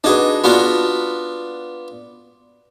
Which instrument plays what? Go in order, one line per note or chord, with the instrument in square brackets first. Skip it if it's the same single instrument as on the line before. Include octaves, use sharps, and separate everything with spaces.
[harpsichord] D4 G#4 [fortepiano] D#4 F#4 B4
[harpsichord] B3 D4 F4 [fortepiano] F#4